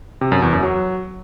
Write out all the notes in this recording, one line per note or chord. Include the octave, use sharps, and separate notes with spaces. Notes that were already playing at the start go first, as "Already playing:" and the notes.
C3
F#2
E2
F#2
F#3